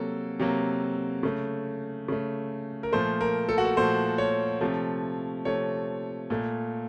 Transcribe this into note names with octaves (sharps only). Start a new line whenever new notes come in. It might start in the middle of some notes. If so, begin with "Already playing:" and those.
Already playing: C3 F#3 A#3 A4
C3 F#3 A#3
C#3 A3
C#3 A3
A#4
A#2 F3 A3 C5
A#4
A4
F#4
A4
A#2 F3 A3 C5
C#5
C3 F3 A3
C3 F3 A3 C#5
A#2 A3